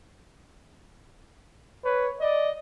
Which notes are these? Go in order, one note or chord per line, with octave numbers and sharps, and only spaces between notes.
B4 C#5
D5 D#5